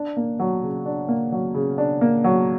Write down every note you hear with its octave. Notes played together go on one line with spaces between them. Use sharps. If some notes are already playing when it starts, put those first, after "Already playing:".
Already playing: D4
A#3
F#3
C#3
D4
A#3
F#3
C#3
D4
A#3
F#3